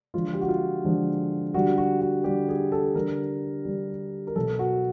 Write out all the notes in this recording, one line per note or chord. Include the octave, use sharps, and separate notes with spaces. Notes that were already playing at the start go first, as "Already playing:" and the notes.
D3 F3 G#3 F4
G4
F#4
F4
D3 F3 G#3
D3 G3 F#4
F#4
F#4
D3 G3 G4
G#4
A4
D3 G3 A#4
D3 G3
A#4
B2 F#3 A4
F#4